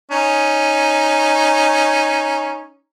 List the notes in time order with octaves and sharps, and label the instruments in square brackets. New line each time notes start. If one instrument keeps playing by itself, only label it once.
[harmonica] C#4 D#4